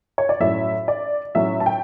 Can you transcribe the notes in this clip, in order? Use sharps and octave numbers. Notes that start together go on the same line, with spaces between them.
C#5
D5
A2 F#3 C#4 E5
D5
A2 F#3 C#4 E5
A5
G5